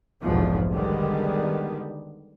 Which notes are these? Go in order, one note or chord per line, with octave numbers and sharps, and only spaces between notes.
F1 B1 E2 G#2 B2 F3
D3 D#3 G3 G#3 B3